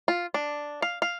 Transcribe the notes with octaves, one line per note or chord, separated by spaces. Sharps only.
F4
D4
F5
F5